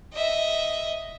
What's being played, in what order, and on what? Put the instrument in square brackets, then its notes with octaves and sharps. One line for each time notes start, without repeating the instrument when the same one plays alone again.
[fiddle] D#5 E5